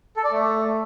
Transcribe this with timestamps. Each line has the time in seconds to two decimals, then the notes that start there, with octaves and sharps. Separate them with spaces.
0.17 A4
0.24 D5
0.32 A3